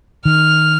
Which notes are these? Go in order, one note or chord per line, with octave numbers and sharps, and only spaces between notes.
D#3 F6